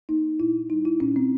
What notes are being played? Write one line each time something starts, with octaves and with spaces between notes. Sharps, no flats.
A#3 D#4
A#2 E4
G3 D#4
E4
A#2 C#4
C4